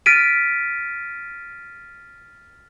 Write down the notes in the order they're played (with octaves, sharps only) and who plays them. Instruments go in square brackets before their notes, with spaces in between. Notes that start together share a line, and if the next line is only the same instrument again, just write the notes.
[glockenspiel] F6 A6 B6 D7 D#7